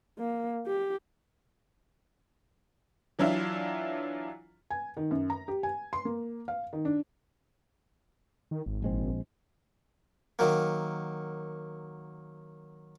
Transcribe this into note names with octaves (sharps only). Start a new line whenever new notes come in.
A#3
G4
E3 F#3 D4 E4 F4
G#5
D#3
F#2
A#5
G4
G#5
C6
A#3
F5
D#3
D4
D#3
G#1
A#1 G#3 C4
D#3 F#3 A#3